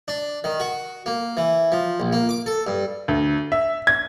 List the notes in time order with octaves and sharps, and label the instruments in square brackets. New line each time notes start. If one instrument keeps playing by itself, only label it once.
[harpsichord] D4
D#3
F#4
A#3
E3
F3
A#1
A#3
D6
A4
G2
[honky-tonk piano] D2
E5
G#6